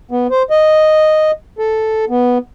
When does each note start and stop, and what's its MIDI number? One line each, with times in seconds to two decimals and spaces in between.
0.11 0.27 59
0.30 0.43 72
0.50 1.31 75
1.59 2.05 69
2.09 2.38 59